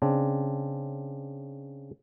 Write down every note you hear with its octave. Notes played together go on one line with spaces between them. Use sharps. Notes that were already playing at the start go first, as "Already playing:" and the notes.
C#3 C4 D4